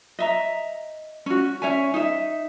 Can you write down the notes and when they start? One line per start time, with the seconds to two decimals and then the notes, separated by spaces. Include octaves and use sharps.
0.19 D#5 E5 A#5
1.26 C#4 F#4
1.62 C#4 C#5 E5 G#5
1.94 D#4 E5